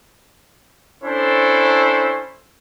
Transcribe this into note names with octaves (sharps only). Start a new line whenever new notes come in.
C#4 D4 E4 A4 C5